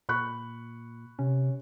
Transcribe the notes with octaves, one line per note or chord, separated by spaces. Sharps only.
A#2 B5 C#6 F#6
C3 C#4